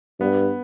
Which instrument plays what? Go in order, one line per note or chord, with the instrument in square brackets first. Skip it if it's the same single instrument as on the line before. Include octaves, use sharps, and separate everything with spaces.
[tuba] G2 [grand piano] B3